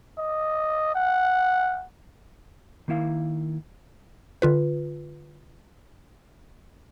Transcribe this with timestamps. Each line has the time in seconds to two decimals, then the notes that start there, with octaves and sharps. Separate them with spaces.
0.18 D#5
0.95 F#5
2.88 D#3 A#3 E4 F5
4.42 D3 F4 B4